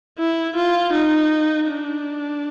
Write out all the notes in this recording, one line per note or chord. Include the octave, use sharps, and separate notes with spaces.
E4
F4
D#4
D4